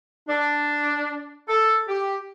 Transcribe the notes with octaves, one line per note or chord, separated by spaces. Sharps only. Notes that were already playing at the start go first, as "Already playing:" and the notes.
D4
A4
G4